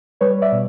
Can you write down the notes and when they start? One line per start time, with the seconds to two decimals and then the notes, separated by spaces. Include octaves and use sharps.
0.21 G3 B4 C#5
0.42 D5 E5
0.52 B2